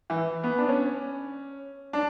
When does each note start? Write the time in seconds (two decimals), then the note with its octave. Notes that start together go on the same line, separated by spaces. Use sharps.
0.10 E3
0.43 B3
0.58 D4
0.68 C#4
1.93 D4